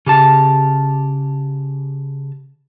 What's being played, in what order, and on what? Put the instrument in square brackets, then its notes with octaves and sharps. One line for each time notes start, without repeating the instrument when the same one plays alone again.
[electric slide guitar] C#3 G4 A5